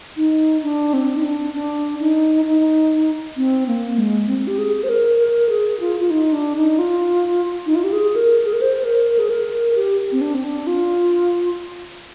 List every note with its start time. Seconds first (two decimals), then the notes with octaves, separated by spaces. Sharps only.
0.17 D#4
0.63 D4
0.94 C4
1.16 D#4
1.23 D4
1.54 D4
2.00 D#4
2.45 D#4
3.37 C4
3.68 A#3
3.98 G#3
4.28 C4
4.47 G4
4.58 G#4
4.84 C5
4.89 A#4
5.20 A#4
5.49 G#4
5.80 F4
6.00 F4
6.10 D#4
6.33 D4
6.56 D#4
6.79 F4
7.66 D#4
7.75 F4
7.84 G4
7.93 G#4
8.16 A#4
8.45 G#4
8.53 A#4
8.61 C5
8.84 A#4
9.19 G#4
9.30 A#4
9.76 G4
10.12 C4
10.21 D4
10.34 C4
10.44 D4
10.67 F4